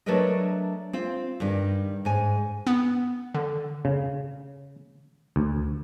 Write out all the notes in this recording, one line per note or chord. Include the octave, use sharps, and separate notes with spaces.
F#3 A3 D4 A#4 B4 D#5
C4 F4
G2 D#3 G3
G#2 G#5
B3
D3
C#3
D2